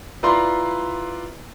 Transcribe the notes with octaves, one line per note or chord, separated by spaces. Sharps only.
E4 F4 B4 D5 A#5 C6